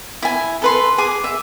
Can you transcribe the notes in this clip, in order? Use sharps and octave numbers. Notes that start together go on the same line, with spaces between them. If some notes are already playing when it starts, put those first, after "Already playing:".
E4 G#5
A4 B4 C6
G#4 G#5 D6
E5